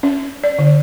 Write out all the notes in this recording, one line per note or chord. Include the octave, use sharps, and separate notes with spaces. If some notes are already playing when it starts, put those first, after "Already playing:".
C#4
D5
D3